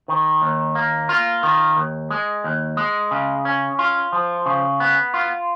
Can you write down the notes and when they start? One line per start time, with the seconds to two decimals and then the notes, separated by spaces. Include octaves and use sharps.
0.08 D#3
0.42 D#2
0.75 A#3
1.09 F4
1.43 D#3
1.77 D#2
2.10 G#3
2.44 D#2
2.77 G#3
3.11 C#3
3.45 C#4
3.79 F4
4.13 F3
4.46 C#3
4.80 B3
5.14 F4